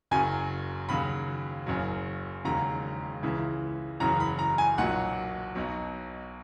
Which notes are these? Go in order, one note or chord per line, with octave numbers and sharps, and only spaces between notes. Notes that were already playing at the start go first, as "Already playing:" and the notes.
F#1 F#2 C#3 F#3 G#5
D#2 C#3 F#3 B5
F#1 F#2 C#3 F#3
E1 D#2 C#3 F#3 A#5
C#2 C#3 E3
F#1 E2 C#3 F#3 A#5
B5
A#5
G#5
B1 A#2 F#3 F#5
B1 B2 F#3